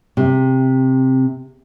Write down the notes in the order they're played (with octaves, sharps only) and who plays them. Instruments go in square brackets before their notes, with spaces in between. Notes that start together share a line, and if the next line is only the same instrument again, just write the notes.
[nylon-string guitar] C3